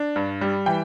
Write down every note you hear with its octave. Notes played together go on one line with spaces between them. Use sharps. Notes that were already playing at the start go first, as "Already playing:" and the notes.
Already playing: D4
G2
G3
E3 G5